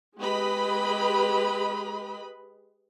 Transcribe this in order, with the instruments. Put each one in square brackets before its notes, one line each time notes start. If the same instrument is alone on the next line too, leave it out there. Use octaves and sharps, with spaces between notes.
[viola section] G#3 G4 B4 D#5 B5